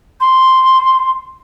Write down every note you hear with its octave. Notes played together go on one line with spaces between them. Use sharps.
C6